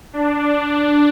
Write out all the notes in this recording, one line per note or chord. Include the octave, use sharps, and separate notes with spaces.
D4